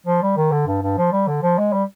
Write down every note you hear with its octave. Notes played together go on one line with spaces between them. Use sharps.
F3
G3
D#3
D3
G2
G2
F3
G3
D3
F3
G#3
G3